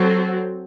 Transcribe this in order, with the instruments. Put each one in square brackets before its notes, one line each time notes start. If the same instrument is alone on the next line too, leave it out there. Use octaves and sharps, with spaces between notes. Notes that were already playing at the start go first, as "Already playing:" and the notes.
Already playing: [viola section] F#3 C4 F#4 A4